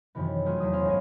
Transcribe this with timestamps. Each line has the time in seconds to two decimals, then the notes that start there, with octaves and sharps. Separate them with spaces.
0.15 F#2 C3 D#3 E3 B3
0.46 F#3 A3 F4 F#4 G#4
0.58 E2 F#3 D#6 E7
0.73 B3 C#4 C5 F5
0.85 G#1 G#3 G#5